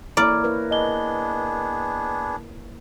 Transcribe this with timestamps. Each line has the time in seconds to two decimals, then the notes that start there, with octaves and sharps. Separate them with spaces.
0.17 A#3 E4 C#5 D5 A#5 B5 F6
0.44 E4 A#4 B4
0.71 B3 D4 G#4 D#5 G7